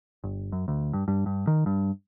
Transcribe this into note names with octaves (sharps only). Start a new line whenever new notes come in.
G1
F#2
D2
G2
G2
G2
D#3
G2